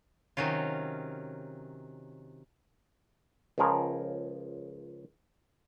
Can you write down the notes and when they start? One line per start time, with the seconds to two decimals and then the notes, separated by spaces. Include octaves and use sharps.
0.37 C3 D#3 F#3 C#4 F4
3.58 C#2 C#3 F3 G#4 A#4